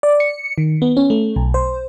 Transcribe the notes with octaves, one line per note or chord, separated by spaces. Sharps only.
D5
C#7
D#3
B3
C#4
A3
B1
C5